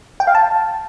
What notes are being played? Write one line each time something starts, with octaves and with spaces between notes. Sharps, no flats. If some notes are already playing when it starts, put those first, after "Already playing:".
G5
F5
A5